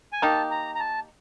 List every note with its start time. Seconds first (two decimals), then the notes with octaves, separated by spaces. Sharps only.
0.13 G#5
0.22 A#3 D#4 G4 A5
0.51 A#5
0.75 A#5
0.80 A5